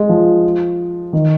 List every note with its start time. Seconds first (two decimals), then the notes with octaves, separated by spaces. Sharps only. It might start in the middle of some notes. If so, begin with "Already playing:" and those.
Already playing: G#3
0.09 F3
1.13 D#3